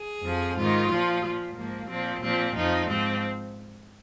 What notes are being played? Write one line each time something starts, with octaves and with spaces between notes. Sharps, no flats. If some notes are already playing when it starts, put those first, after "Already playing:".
Already playing: G#4
F2 F3
G#2 D#3 F4
A#2 F3
A#2 F3
G#2 F3 A#3
A#2 F3 C4
A#2 F3 C4
F2 F3 D#4
G#2 F3 C4